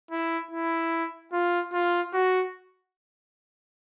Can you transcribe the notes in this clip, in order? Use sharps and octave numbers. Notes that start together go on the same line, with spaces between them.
E4
E4
F4
F4
F#4